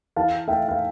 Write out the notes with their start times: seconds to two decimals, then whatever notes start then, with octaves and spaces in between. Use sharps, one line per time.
0.16 E3 F5 A5
0.47 A3 E5 G5
0.68 F5